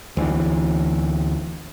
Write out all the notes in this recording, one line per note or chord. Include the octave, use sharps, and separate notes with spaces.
D2 E3